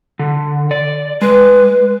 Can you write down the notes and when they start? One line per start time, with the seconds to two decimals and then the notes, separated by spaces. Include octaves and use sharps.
0.19 D3
0.71 D5
1.22 G#3 B4